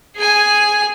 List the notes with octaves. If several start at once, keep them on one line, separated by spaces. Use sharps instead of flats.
G#4 G#5